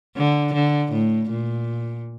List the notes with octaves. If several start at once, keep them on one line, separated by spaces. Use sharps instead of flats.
D3
D3
A2
A#2